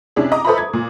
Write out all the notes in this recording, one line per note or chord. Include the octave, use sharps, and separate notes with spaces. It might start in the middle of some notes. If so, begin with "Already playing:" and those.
C3 C#4 D4 E4 G#4
D#5 A#5 D6 D#6
A4 B4 C5 E5 A#5 B5
G#6
A#2